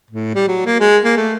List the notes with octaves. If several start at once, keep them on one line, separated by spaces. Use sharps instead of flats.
A2
G3
F#3
A#3
G#3
A#3
A3